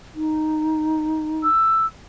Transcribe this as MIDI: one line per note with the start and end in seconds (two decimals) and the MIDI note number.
0.15 1.47 63
1.43 1.86 88